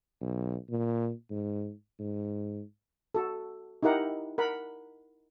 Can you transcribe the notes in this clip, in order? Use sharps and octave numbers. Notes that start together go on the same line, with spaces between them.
B1
A#2
G#2
G#2
F#4 A4
D#4 E4 G4 A#4 F#5
A#4 F#5 B5